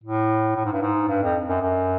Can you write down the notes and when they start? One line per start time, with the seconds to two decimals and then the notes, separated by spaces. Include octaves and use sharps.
0.04 A2
0.56 A2
0.65 G#2
0.73 G2
0.82 G#2
1.08 G2
1.23 F2
1.49 F#2
1.62 F#2